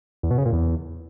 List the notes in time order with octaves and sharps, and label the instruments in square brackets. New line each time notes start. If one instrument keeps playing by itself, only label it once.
[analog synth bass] E2
B2
C#3
A#2
E2